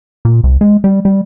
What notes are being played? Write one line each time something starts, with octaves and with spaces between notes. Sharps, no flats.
A#2
C2
G#3
G3
G3